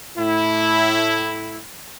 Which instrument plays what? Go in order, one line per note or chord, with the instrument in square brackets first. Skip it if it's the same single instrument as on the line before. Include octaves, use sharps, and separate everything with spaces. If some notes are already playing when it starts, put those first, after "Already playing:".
[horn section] A2 E4